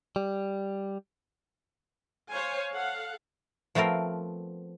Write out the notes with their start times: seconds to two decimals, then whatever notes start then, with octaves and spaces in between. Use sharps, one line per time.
0.16 G3
2.31 C5 C#5 F5 G#5
2.73 A4 F5 F#5
3.75 F3 A3 B3 C4 A#4